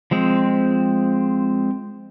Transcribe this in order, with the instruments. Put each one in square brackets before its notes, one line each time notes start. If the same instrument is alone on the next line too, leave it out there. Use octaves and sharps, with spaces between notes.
[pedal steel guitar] F3 G#3 C4